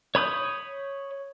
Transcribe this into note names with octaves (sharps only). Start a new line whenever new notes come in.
C#5 B5 D#6 G6